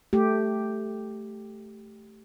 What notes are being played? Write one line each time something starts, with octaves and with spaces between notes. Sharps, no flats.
A3 G4